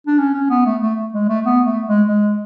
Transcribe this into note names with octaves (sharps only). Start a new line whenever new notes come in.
D4
C#4
C#4
B3
A3
A3
G#3
A3
B3
A3
G#3
G#3